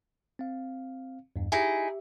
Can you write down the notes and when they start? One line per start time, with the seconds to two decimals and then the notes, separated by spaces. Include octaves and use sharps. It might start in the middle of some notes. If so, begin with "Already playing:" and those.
0.39 C4 F5
1.36 E2 G2
1.52 D#4 E4 G4 G#4 E5